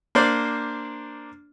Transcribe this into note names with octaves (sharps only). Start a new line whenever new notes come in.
A#3 D4 C5 D5